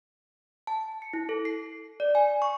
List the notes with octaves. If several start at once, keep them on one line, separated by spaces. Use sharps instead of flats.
A5
C#7
E4
A4
C7
D5
G#5
C#6